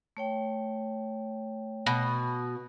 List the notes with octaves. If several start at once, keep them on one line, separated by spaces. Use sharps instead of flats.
A3 C#5 G5
B2